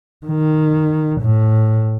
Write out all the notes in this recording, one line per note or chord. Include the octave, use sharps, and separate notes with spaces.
D#3
A2